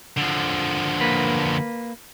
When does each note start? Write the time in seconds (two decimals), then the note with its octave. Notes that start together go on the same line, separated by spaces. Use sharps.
0.17 D3 F3
1.01 A#3 B4